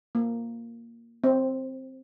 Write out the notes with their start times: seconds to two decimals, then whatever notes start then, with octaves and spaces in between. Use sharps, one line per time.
0.15 A#3
1.24 C4